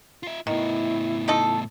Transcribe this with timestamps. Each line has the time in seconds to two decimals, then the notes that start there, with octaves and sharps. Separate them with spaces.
0.23 F4 E5
0.47 A2 D#3 B3 E4
1.28 A3 D#4 A4